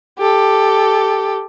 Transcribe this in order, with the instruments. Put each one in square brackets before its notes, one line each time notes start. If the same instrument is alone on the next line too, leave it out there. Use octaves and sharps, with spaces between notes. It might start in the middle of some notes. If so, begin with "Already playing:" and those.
[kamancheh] G4 A4